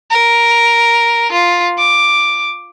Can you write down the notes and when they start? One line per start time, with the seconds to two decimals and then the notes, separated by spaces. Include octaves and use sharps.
0.11 A#4
1.31 F4
1.78 D6